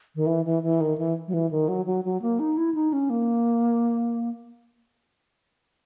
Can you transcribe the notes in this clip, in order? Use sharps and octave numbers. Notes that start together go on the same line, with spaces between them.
D#3
E3
E3
E3
D#3
E3
F#3
E3
D#3
F#3
F#3
F#3
A#3
D#4
E4
D#4
C#4
A#3